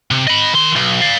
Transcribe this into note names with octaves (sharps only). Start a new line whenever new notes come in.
C3
D#5 B5
D#3 C6
B1
D5 F5